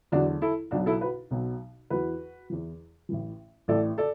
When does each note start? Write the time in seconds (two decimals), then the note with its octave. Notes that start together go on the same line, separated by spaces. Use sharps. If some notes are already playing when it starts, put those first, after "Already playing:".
0.12 E2 D3 F#3 D4 F#4
0.42 E4 A4
0.71 B1 B2 F#3 D4 F#4
0.86 E4 A4
1.01 F#4 B4
1.31 B1 B2 F#3
1.90 E2 E3 F#4 B4
2.50 E2 E3
3.09 A1 A2 E3
3.68 A1 A2 E3 A4 D5
3.98 A4 D5